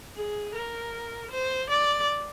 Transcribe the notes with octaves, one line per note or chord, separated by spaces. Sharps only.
G#4
A#4
C5
D5